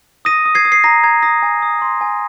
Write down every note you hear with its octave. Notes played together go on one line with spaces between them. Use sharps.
D#6 A#6 D#7
D#6
G#6 C7
D#6
C7
A#5 A#6
A#5 G#6
D#6 A#6
G#5
D#6
C6
G#5